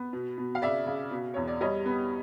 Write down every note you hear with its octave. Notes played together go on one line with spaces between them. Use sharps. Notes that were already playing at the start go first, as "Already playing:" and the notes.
Already playing: B3
B2
B2
F5
C#3 D5 E5
C#3
B2
E2 C#5
D5
G3 C#5 D#5
B3